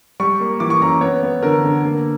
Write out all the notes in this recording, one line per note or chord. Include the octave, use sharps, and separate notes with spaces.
G3 C#6
A#3
E3 D6
C#6
F#2 A#5
B3 C#5
B3
D3 A#4
D3
A#3